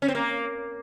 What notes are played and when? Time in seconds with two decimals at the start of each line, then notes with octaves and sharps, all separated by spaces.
0.02 C#4
0.08 C4
0.15 A#3